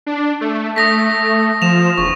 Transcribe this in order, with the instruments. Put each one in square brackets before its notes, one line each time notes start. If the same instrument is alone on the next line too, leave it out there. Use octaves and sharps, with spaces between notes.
[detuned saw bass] D4
A3
[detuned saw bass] A3 [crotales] D#6 A#6 B6
[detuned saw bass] F3 [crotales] E7 F7
[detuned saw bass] E1 [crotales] C#6